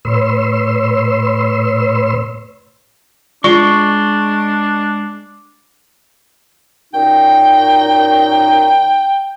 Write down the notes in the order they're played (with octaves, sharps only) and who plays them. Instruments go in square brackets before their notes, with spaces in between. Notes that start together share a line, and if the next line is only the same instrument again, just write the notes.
[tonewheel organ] A2 B4 C#5 C6 E6
[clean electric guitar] G#3 [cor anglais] D4 [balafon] F4 D5 [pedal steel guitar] C#6
[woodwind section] F#2 A#2 D#4 [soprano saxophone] G5